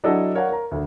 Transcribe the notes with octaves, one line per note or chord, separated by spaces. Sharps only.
F#3 D4 E4 A4 D#5 F#5
A#4 C#5 D5 F5 F#5
A#4 A#5
D2 D3